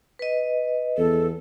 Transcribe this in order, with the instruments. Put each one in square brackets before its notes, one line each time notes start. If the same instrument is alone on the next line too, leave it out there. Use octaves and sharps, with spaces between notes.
[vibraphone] B4 D#5
[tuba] E2 [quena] A4